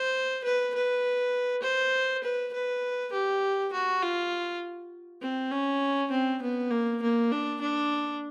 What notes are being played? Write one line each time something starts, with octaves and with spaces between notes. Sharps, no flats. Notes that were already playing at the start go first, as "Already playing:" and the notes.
Already playing: C5
B4
B4
C5
B4
B4
G4
F#4
F4
C4
C#4
C4
B3
A#3
A#3
D4
D4